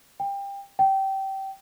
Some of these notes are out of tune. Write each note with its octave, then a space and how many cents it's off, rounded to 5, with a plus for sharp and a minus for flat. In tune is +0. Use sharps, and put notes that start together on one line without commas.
G5 +25
G5 -20